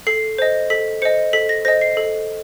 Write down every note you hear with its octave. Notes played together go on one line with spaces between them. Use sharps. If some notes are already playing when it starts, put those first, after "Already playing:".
A4 C7
C5 D#5
A4 B6
C5 D#5 C#7
A4 B6
A#6
C5 D#5 A#6
C7
A4